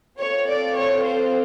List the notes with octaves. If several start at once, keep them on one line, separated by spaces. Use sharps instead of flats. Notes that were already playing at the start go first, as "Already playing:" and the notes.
C4 F4 A4 C#5
D5
C#5
C5